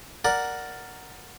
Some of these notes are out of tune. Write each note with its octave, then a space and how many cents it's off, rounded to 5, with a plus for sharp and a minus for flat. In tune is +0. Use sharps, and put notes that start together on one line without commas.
A#4 +0 D5 +0 F#5 +0